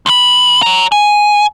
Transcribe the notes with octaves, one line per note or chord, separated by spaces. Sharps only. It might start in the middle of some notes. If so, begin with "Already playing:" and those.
C#2 B5
C#5 A#5
G#5